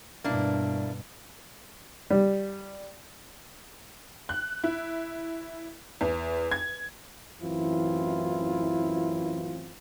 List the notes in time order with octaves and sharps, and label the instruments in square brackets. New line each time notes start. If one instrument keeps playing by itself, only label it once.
[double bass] G2 B2 [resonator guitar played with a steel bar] A#3 D4 E4
[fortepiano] G3
[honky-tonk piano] F#6
E4
E2
G#6
[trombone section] A1 F#2 E3 C4 E4 F4